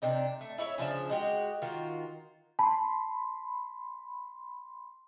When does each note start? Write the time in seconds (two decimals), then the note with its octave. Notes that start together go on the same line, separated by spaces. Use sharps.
0.02 C3 D4 D#4
0.41 A3
0.58 E4 C#5 D#5 E5
0.78 C#3 F3 D4 A5
1.10 G#3 F#4 G4
1.62 D#3 F4 F#4
2.59 A5 B5 C6